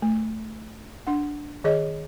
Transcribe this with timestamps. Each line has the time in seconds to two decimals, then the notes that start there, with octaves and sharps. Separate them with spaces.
0.02 A3
1.07 D4 F#5
1.64 D#3 G#4 C#5 D#5